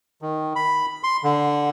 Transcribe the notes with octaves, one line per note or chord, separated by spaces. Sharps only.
D#3
B5
C6
D3